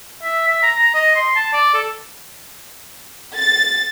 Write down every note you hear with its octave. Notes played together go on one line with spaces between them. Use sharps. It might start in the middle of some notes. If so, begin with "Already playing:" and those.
E5
E5
A#5
A#5
D#5
C6
A5
D5
A4
A6